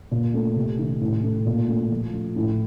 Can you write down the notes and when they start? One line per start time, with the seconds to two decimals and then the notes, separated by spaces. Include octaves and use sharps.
0.11 A#2
0.34 A3
0.56 C3
0.79 D#3
1.01 A2
1.23 A3
1.46 A#2
1.69 A3
1.91 F3
2.13 A3
2.36 A2